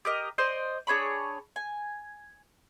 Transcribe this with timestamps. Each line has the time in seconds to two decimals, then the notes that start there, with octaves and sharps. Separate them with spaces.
0.05 G4 A#4 D#5
0.38 C5 D5 D#5
0.87 D4 G#4 C#5 B5
1.56 G#5